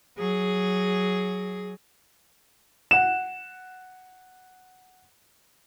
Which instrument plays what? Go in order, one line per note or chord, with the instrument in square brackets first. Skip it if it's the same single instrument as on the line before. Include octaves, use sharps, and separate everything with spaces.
[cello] F#3 G#4
[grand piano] F#5 E7